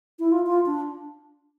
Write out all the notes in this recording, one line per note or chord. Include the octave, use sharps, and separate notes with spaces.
E4
F4
F4
D4